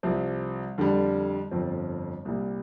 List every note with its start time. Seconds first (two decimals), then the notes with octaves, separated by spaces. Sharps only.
0.03 C2 C3 F3 C4
0.78 F2 D3 G3
1.51 G1 F2 F3 C4
2.25 C2 A#2 G3